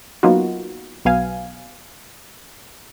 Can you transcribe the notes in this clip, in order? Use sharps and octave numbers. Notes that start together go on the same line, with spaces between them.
F#3 A#3 B3 D#4 F4 F#4
B1 F#3 B3 F5 G#5